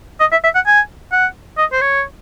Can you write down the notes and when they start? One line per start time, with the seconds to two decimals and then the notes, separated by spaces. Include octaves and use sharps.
0.20 D#5
0.32 E5
0.44 E5
0.55 F#5
0.66 G#5
1.12 F#5
1.58 D#5
1.72 C5
1.81 C#5